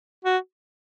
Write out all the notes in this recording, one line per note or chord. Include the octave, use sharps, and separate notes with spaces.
F#4